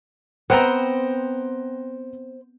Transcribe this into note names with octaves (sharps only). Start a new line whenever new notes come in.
B3 C4 C5 F#5 G5 A#5